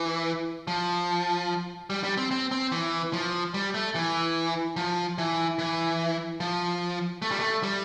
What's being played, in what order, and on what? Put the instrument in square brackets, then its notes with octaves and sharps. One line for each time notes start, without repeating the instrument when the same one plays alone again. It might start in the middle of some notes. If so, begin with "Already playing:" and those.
Already playing: [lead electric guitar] E3
F3
G3
G3
C4
C4
C4
E3
F3
G3
A3
E3
F3
E3
E3
F3
A3
G3
A3
G3